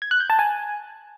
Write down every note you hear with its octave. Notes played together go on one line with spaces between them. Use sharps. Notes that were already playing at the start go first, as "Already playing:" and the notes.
G#6
F#6
G6
A5
G#5